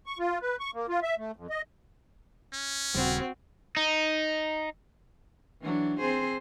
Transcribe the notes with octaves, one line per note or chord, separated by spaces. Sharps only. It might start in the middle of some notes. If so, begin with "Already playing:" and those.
C#6
F4
B4
C#6
A#3
F4
E5
A3
F2
D#5
C#4
D#1 C#3 G3 C4 F#4
D#4
E3 F#3 D4
C4 G#4 C5